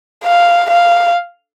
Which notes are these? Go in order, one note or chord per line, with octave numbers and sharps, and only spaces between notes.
F5
F5